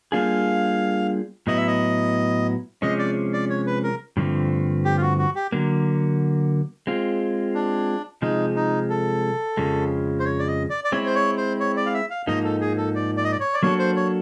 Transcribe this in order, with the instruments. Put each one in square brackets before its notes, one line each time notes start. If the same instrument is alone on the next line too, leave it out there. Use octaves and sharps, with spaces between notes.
[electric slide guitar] G3 A#3 D4 F4 G#4 [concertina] F5
[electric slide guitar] A2 F#3 B3 E4 [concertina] D#5
[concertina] E5
D#5
[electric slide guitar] C3 F3 G#3 C#4 [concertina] D#5
[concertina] D5
D5
C#5
B4
A#4
[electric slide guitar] G2 D3 F3 A3 C4
[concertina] G4
F4
F#4
F#4
G4
[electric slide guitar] D3 F#3 A#3
G#3 C4 F4
[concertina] D4
[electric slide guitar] C3 F3 G#3 [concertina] D#4
[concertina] D#4
A4
[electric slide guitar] F2 C#3 F3 G#3
[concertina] C5
C#5
D5
D#5
D5
D5
[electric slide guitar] G#3 C4 E4 [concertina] C#5
[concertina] C5
C#5
C5
C#5
D5
F5
E5
F5
[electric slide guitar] G#2 F3 A#3 D#4 [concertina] D#5
[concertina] A4
G#4
A4
D5
D5
D#5
D5
C#5
D5
[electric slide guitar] F#3 A#3 D4 F#4 A4 [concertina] C#5
[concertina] C5
C#5